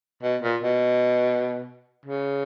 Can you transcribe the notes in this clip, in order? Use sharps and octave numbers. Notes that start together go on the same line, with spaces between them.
B2
A#2
B2
C#3